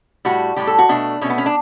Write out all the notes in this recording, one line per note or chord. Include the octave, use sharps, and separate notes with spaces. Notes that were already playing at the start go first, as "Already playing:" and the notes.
A2 G3 F#4
A2 G3 G4
A4
F#4
B2 A3 D4
B2 A3 B3 C#4
C#4
D4